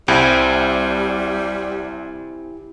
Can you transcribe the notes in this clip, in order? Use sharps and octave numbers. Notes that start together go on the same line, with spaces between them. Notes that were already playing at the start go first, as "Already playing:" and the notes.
C2 G3 C4 E4 G4 G#5